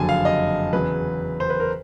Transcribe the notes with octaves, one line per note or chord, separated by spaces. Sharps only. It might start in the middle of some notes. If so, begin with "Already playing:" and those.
Already playing: F#1 F2 D3 F#3 G#5 A5
F5
D#5
E2 C#3 F#3 B4
C5
B4
A#4